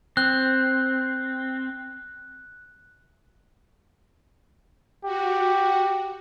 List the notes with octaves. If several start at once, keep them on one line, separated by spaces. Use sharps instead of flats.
C4 F#6
F#4 G4